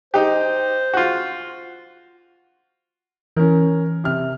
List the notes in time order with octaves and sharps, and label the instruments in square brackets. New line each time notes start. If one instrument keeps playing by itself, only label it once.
[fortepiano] D#4 G4 [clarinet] C5
[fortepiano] F4 F#4
[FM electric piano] E3 [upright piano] C#4 A#4
[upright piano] C3 F6